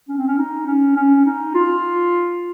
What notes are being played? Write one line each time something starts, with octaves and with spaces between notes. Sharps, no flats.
C#4
C4
C#4
D#4
C#4
C#4
D#4
F4